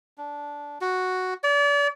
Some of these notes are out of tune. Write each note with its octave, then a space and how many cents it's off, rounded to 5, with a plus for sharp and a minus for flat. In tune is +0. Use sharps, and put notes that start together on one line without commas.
D4 -15
F#4 +0
D5 -35